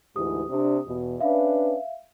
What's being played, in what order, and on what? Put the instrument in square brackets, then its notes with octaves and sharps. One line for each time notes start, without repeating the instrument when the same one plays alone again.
[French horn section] D2 G#2 E3 [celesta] G4 D#6
[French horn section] C3 D4
E2 B2
[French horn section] C#4 D4 B4 [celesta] E5 F5